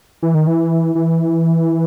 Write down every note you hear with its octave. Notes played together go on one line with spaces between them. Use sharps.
E3
D#3
E3
E3